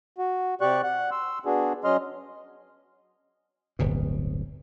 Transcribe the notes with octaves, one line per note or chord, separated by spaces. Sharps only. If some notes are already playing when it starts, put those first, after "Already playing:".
F#4
C3 G4 D5 C#6 F#6
F#5 F#6
C6 E6
B3 D4 F#4 G#4
F#3 C#4 D#5 C6 F6
D1 G1 B2